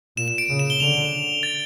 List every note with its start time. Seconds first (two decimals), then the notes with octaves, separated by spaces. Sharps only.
0.17 A#2 E7
0.28 E7
0.38 D7
0.49 C#3
0.59 E7
0.70 G7
0.80 D3 F7
1.43 A6